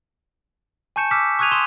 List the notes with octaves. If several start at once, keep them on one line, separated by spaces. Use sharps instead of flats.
G#5 A5 C#6 G6 C#7 E7
D6 E6 F6 B6 E7
C#6 D#6 F#6 G#6 D#7 F7
C6 D#6 E7 G7